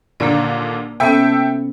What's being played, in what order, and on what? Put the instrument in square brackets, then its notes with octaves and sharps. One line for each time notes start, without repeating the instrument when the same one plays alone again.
[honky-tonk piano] D#2 A#2 D3 [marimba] A#3 D5
[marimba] C3 B3 C#4 [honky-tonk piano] A4 E5 G5